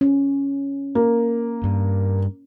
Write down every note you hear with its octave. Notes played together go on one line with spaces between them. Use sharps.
C#4
A#3
G2